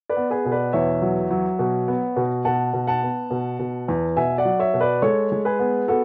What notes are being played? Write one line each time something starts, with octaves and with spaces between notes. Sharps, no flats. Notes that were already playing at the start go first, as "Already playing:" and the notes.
B4 D5
B3
G#4 B4
B2
B4 D5
E2 C#5 E5
F#3
F#3
B2
B3
B2
B2 F#5 A5
B2
F#5 A5
B3
B2
B2
E2
B2 E5 G#5
D5 F#5
F#3
C#5 E5
B2
B4 D5
G#3 A4 C#5
G#3
G#4 B4
B3
B3 F#4 A4